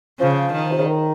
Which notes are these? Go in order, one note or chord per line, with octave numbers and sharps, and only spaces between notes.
C#3 F3
D#3
C3
C#3
D#3